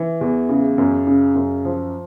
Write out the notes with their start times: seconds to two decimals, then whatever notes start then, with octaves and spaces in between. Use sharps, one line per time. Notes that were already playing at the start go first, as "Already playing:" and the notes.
Already playing: E3
0.21 E2
0.49 C#3
0.78 F#2
1.07 C#3
1.35 F#2
1.65 F3